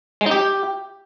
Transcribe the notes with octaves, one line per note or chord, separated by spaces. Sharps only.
G#3
D#4
G4